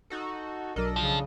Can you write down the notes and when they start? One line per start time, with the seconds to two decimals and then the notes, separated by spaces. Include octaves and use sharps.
0.10 D#4 F#4 A4
0.76 B1 F#3 D4 A4 A#4 D#5
0.96 C#3 F3